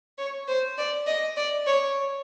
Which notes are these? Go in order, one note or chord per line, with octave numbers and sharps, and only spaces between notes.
C#5
C5
D5
D#5
D5
C#5